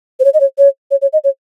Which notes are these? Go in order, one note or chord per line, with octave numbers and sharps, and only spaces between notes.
C5
C#5
D#5
C#5
C#5
C#5
C#5
D#5
C#5